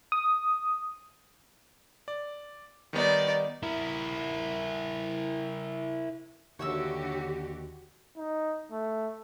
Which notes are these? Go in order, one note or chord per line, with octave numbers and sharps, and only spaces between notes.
D#6
D5
D#3 G3 B3 D#4 D5
E4 A#4
D#2 D3 F#4 G4 C#5 E5 E6
D#4
A3